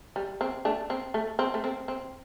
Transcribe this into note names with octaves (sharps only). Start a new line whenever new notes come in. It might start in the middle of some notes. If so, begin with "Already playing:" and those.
G3
C4
A3 D4
C4
A3
C4
A3
C4
C4